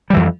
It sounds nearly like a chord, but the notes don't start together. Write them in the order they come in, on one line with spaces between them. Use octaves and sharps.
G3 E3 F2